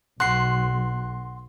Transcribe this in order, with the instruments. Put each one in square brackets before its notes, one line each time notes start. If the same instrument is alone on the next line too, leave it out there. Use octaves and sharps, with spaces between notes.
[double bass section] B1 [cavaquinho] F#4 [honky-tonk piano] C6 [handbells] F#6 C7